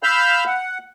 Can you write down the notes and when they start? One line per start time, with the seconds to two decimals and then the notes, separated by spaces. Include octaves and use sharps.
0.03 F5 B5 E6 F6 G6
0.46 F#5